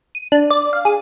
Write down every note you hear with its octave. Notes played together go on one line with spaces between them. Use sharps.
D#7
D4
D5
F5
G#4